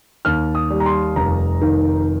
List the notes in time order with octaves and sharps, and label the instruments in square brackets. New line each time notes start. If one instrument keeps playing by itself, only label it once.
[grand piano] D#2 F6
D#6
G3
A#5
C6
F1 A#5
D#3